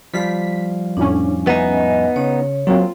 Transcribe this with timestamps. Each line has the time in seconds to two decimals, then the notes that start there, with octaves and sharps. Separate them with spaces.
0.14 F3 G3 F5 B6
0.97 F2 A2 C#4 D4
1.47 B3 D#4 D#5 E5 G#5
2.16 C#3 C#5
2.67 F#3 A#3 C4 F4